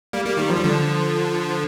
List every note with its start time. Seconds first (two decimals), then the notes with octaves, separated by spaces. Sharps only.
0.13 G3 A#3
0.25 G3 A#3
0.37 D#3 G3
0.50 F3
0.57 G3
0.64 D3 F3